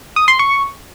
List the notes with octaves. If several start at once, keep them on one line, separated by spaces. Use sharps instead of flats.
D#6
C6
C#6